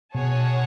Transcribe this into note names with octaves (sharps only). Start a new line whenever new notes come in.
B2 G#4 C#5 F#5 A5